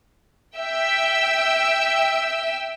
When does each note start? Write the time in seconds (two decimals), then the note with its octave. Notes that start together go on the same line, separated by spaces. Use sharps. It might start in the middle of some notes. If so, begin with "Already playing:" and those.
0.56 E5 G5 E6